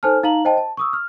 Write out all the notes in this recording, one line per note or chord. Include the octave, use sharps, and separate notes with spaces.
D#4 A4 C5 G#5 A5 F6
D#4 F5 A#5 F#7
C5 D#5 G5 A5
A5
C#6 D#6 E6
F6